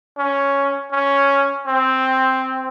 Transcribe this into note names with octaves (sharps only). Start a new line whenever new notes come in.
C#4
C#4
C4